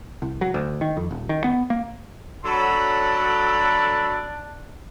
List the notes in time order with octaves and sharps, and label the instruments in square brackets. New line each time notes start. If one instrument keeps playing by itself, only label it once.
[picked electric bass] C2
F#3
D2
D#3
F2
D#1
D#3
B3
A#3
[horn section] F#3 A4 [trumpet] D4 [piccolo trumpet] B5